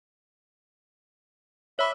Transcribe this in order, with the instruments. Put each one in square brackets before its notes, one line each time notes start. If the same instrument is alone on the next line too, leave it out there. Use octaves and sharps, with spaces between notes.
[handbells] C#5 B5 D6 [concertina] E5